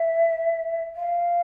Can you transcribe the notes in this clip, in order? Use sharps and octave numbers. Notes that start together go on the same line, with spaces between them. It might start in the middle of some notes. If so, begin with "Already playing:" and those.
Already playing: E5
F5